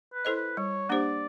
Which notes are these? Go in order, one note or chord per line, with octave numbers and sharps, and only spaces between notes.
B4
E4 A4 C5 D#5
B4
G3 C#5
A#3 D4 G4 C5 D5